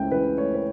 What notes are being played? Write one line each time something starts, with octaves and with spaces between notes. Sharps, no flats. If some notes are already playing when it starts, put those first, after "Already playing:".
Already playing: C#2 C#3 E3 A3 G5
E3 B4
A3 C#5
B4